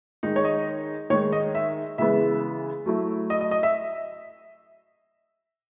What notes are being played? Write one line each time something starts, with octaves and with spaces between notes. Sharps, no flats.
D#3 G#3 D#4
C#5
D#5
D#3 G#3 D#4 C#5
D#5
E5
C#3 E3 G#3 B3 E5
F#3 A3 E4
D#5
D#5
D#5
E5